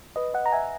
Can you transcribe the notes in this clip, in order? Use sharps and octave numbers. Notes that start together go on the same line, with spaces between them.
B4 D#5
D#5 F#5
A#5
E5 G#5